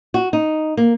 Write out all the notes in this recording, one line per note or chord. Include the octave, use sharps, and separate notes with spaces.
F#4
D#4
A#3